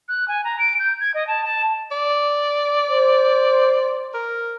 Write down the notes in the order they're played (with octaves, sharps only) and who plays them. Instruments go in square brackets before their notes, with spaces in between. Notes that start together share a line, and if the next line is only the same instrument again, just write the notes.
[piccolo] F#6
G#5
A#5
D7
G6
G#6
D#5
A5
A5
[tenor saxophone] D5
[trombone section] C5
[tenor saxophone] A#4